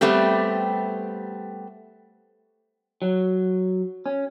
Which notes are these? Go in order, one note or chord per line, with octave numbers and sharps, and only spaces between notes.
G3 A3 B3 C4 G4
F#3
C#4